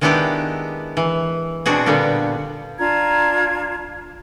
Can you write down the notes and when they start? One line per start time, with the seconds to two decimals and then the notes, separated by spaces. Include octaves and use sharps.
0.01 D#3 G#3 B3 D4 E4 G4
0.97 E3
1.66 B2 C4 D4 F#4 G#4
1.86 A#2 D3 G3 B3
2.79 D4 F4 A#5 G#6